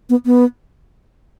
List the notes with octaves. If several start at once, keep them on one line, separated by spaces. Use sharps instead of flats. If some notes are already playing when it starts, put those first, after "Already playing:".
B3
B3